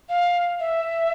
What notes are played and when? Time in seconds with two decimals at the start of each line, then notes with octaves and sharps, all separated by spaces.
0.09 F5
0.60 E5